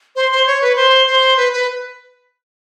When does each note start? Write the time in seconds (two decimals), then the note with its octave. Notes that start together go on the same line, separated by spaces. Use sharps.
0.16 C5
0.31 C5
0.47 C#5
0.62 B4
0.76 C5
1.07 C5
1.37 B4
1.53 B4